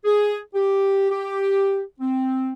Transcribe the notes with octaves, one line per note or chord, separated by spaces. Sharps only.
G#4
G4
G4
C4